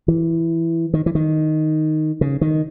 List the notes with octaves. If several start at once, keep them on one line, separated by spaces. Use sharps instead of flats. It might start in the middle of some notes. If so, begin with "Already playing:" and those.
E3
D#3
E3
D#3
C#3
D#3